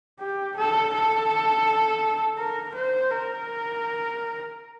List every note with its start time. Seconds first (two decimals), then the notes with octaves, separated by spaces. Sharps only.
0.20 G4
0.57 A4
0.93 A4
2.38 A#4
2.74 C5
3.10 A#4